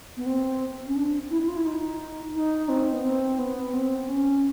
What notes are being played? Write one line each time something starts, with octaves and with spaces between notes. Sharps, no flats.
B3
C4
C#4
D4
E4
E4
F4
E4
D#4
D#4
C4
B3
C4
B3
C4
C4
C#4